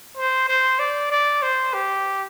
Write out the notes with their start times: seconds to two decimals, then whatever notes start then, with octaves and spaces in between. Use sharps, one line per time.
0.17 C5
0.48 C5
0.79 D5
1.11 D5
1.42 C5
1.74 G4